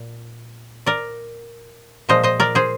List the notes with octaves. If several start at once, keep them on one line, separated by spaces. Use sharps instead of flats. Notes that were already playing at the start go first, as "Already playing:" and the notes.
Already playing: A#2
A#4 D5
A#2 F3 G#3 C5 D#5
C5 D#5
A#4 D5
G#4 C5